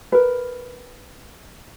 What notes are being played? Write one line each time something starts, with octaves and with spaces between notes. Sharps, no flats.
A#4 B4